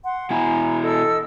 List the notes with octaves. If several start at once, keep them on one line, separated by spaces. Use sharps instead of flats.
F#5 C6
B2 E4 G#5 A#5 B5
A4 D#5 E6